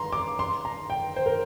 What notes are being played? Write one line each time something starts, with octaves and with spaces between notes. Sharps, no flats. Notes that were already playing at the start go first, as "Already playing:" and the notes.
Already playing: A#5 C6
D6
C6
A#5
G5
C5
A#4